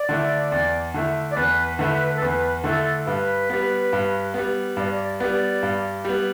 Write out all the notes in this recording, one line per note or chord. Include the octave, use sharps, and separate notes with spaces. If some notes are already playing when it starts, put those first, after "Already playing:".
Already playing: D5
D3 A3 E4
E2
D3 A3 E4
D5
E2 B4
D3 A3 E4 B4
A4
E2 B4
D3 A3 E4 A4
G2 B4
G3 B3
G2
G3 B3
G2 D5
B4
D5
G3 B3
G2
G3 B3